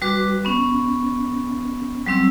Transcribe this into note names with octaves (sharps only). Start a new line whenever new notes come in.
G3 F#4 B4 D6
B3 C#4
F#3 G3 C4 E6